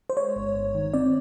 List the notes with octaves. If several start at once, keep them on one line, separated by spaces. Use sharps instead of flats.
C5
G#3 C#5
G1
G1
D#3
C4 D5